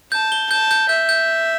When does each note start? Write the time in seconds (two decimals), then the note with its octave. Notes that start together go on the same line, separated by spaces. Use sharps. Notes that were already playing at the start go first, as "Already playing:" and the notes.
0.12 A5 G6
0.32 G7
0.50 A5 G6
0.71 G6
0.89 E5 G6
1.09 G6